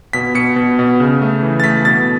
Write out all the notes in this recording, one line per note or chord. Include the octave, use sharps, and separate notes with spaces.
B2 B6
B2 C#7
B2
B2
C#3
A3
E3
A6
A3 B6
B2 A6